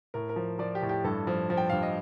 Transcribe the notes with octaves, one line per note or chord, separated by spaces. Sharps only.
A2 A#4
A#4
F3
F3 D5
G4
A2
G4
G2 A4
F3
F3
G5
G2 F5
D#5